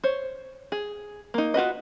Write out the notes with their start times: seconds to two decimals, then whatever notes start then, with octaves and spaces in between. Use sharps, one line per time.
0.04 C5 C#5
0.72 G#4
1.34 A#3 D#4
1.54 F4 F#4 B4 D#5